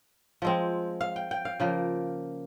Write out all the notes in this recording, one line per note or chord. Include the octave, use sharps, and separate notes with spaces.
F3 G#3 C4
F5
G5
G5
F5
C#3 F3 A#3